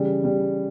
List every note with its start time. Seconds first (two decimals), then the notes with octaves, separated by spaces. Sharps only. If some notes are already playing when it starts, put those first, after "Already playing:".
Already playing: C#3 E3 G3
0.24 G3